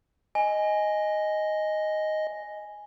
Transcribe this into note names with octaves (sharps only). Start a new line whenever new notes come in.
D#5 G#5